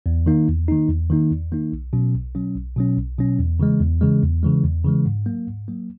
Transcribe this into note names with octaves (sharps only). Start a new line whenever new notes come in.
E2
D#3 A#3 D#4
E2
D#3 A#3 D#4
E2
D#3 A#3 D#4
E2
D#3 A#3 D#4
B1
B2 F#3 C#4
B1
B2 F#3 C#4
B1
B2 F#3 C#4
B1
B2 F#3 C#4
E2
C#3 E3 G#3
E2
C#3 E3 G#3
E2
C#3 E3 G#3
E2
C#3 E3 G#3
G#2
F#3 A#3
G#2
F#3 A#3